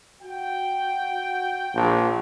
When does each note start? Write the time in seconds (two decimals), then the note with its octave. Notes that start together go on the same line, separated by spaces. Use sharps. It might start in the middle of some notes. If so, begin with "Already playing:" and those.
0.23 F#4 G5
1.75 A#1